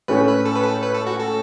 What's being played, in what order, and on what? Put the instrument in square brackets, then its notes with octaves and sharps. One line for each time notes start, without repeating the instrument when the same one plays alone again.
[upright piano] A2 A3 C#4 [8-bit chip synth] B4
[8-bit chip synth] B4
A4
B4
A4
B4
A4
F#4
A4